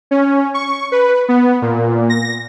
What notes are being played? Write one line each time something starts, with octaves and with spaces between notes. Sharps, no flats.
C#4
C#6
B4
B3
A#2
A#6